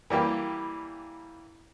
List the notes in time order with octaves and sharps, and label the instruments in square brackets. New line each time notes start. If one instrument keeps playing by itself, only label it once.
[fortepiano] E3 G3 A#3 G4